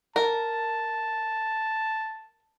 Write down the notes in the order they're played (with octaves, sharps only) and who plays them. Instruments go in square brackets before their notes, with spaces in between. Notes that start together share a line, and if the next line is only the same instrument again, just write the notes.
[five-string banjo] A#4 [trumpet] A5